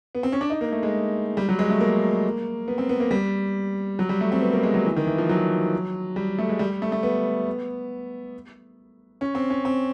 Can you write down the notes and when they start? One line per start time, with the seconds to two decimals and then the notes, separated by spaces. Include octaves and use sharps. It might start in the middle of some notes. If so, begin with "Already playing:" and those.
0.15 B3
0.23 C4
0.32 C#4
0.41 D4
0.50 D#4
0.61 A#3
0.72 A3
0.83 G#3
1.37 G3
1.49 F#3
1.59 G#3
1.70 A3
1.80 A#3
2.68 B3
2.78 C4
2.89 B3
3.00 A#3
3.11 G3
3.99 F#3
4.09 G3
4.21 A3
4.32 C4
4.41 B3
4.53 A#3
4.63 G#3
4.74 F#3
4.86 E3
4.96 D#3
5.07 E3
5.18 F3
5.29 F#3
6.16 G3
6.38 A3
6.49 G#3
6.59 G3
6.82 A3
6.92 A3
7.03 B3
9.21 C#4
9.35 C4
9.50 C#4
9.65 C4